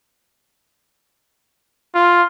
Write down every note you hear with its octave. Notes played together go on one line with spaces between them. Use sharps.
F4